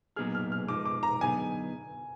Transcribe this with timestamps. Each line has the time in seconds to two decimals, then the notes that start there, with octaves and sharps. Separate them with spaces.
0.16 A#2 F#3 B3 D#4 G#4 F6
0.35 F6
0.52 F6
0.68 F3 G#3 D#4 D6
0.85 D6
1.03 A#5
1.21 D3 F#3 B3 D#4 G#4 G#5